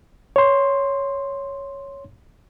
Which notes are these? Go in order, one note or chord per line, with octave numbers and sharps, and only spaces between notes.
C#5 C6